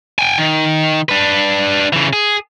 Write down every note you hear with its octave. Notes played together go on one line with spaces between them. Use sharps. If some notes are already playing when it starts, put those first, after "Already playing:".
G5 G#5
D#3
D4 B4
C#3 E3
G#4